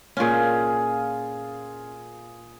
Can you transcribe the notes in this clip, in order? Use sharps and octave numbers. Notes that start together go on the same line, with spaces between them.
A#2 C#4 F4 G#4